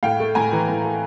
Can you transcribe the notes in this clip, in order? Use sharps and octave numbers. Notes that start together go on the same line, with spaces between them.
A2 F5 G5
A3
A2 G#5 A#5
E3
A2
A3